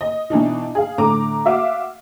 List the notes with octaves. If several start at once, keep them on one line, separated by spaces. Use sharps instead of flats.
D#5
B2 E3 D4 D#4
G#4 F5
A2 D3 A#5 D6
F#4 E5 F5 D6